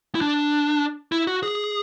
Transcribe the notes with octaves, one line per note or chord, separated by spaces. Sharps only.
E4
D4
E4
F#4
G#4